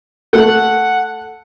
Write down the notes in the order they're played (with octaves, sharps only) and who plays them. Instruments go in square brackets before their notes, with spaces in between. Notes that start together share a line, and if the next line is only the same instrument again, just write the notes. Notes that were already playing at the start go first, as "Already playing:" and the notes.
[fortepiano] A3 [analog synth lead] F#5